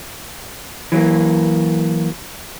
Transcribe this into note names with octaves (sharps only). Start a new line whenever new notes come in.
E3 F#3 A#3